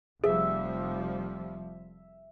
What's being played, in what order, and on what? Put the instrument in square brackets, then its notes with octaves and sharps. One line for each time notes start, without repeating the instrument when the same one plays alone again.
[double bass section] F1 F3 G3 [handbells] G#4 [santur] E5